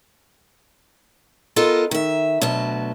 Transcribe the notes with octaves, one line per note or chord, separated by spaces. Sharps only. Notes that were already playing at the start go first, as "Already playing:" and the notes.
B3 F4 A4 A#4 D#5
D#3 E5
D2 B2 F#3 B4 A5